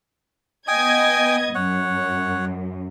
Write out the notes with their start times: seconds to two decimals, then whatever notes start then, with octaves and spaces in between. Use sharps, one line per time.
0.68 B3 D#5 G5 G#5 D#6 G#6
1.55 F#2 C#5 F#5